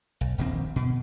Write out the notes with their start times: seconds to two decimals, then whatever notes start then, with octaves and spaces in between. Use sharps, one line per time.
0.21 B1
0.38 D#1 A#1 D#3 C4
0.76 B2